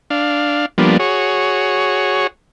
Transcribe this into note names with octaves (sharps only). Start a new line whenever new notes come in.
D4 F5
F3 G3 A#3 B3 D4
F#4 G#4 C#5